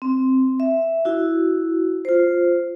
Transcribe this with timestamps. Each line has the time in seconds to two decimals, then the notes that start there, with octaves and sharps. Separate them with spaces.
0.02 C4
0.60 E5
1.05 E4 F#4
2.05 F4 C5